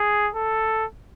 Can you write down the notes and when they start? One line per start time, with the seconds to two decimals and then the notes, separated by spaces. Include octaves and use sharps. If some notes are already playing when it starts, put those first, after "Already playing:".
Already playing: G#4
0.35 A4